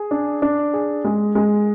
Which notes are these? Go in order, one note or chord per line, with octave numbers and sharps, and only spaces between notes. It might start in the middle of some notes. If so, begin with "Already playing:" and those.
Already playing: G#4
D4
D4
G#4
G#3
G#3